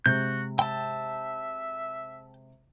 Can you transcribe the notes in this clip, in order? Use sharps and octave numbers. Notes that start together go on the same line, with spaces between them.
C3 G#3 F#4 G6
E5 G5 A5